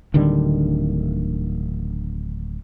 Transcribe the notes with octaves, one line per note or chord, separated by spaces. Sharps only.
D1 D3 D#3 G3